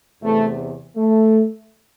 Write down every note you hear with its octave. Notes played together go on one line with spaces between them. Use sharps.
E2 C3 E3 A3
A3